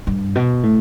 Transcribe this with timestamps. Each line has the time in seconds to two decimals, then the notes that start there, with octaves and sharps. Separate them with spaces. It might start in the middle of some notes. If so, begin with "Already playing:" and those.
0.07 G2
0.35 B2
0.63 A2